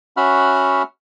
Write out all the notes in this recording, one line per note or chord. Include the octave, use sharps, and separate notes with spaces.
C#4 F#4 E5 F#5 B5 F6